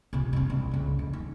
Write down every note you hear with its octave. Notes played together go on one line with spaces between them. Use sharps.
C3 F4
G2 C3
C2
C#2 F#2
F2
D#4